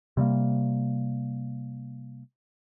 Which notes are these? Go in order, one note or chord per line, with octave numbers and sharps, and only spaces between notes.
C3 G3 G#3 A#3